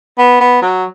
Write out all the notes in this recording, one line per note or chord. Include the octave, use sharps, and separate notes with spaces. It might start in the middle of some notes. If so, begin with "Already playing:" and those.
B3
B3
F#3